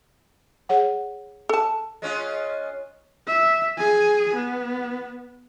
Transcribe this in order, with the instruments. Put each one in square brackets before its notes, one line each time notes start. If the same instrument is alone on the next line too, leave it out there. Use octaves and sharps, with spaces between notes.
[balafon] G#4 C#5 F#5
[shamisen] A4 A5
[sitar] G#3 C#4 F4
[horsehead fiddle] E5
G#4 G#5
B3